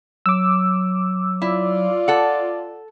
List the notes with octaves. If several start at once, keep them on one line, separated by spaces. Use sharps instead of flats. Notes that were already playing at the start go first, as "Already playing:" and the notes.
F#3 D6 E6
E4 F4 D5
A4 F#5